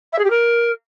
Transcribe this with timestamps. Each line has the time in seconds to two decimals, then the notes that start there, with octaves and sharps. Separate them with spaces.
0.13 E5
0.19 G#4
0.24 G4
0.30 A#4